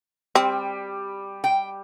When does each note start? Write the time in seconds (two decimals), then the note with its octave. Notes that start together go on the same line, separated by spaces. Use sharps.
0.35 G3 C4
1.44 G5